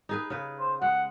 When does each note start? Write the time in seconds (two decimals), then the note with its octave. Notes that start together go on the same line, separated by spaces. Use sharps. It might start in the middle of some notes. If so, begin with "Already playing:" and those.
0.09 D#4 G#4 B4
0.30 C#3 B4
0.60 C5
0.82 G#3 F#5